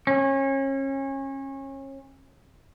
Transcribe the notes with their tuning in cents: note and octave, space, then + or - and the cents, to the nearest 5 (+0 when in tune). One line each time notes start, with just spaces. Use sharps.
C#4 -30